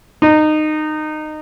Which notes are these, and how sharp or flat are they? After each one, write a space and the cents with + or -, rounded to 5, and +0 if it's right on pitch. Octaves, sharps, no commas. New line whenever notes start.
D#4 -20